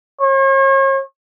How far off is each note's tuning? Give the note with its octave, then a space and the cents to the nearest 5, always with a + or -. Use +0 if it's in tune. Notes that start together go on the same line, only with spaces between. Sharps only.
C#5 -40